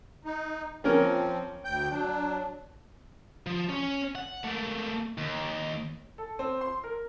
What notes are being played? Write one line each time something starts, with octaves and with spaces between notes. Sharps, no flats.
D#4
F3 A#3 C4 C#4 A#4
D2 G5 G6
F#3 D4
F3
C#4
F#5
A3 A#3
D#2
A4
C4
C6
A#4